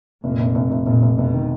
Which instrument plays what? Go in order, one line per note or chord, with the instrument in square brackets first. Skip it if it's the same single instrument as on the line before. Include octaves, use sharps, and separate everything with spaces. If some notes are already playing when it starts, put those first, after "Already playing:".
[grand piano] F1 [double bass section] A#2
[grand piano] F1
F1
F1
[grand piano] F1 [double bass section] A#2
[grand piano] F1
[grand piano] F1 [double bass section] B2
[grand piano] D#3